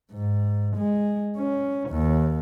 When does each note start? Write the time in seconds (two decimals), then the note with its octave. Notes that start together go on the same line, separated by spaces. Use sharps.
0.13 G#2
0.76 G#3
1.37 C#4
1.89 D#2